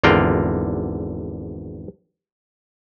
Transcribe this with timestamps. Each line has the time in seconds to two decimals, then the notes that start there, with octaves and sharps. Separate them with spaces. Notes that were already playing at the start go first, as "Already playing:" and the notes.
0.04 G#1 E2 D3 F4 A#4 G5